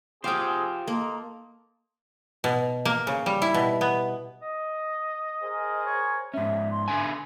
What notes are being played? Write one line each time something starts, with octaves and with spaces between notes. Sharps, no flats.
C4 F4 G4 G#4 C5 F5 G5
A#3 D#4 A4 C6
B2
A#3
C#3
G3
E4
B2
B3
D#5
G#4 A#4 C5
C#5
G#2 C#4 E5
C6
D3 E5 G#5